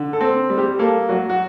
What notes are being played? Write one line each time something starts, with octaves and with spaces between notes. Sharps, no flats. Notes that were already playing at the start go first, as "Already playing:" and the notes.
Already playing: D3
A4
C4
G3
G4
A#3 A4
F#3 F#4
F#4